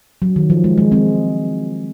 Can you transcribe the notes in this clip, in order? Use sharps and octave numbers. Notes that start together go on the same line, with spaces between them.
F#3
D#3
F3
G#3
G#3
G#3 C4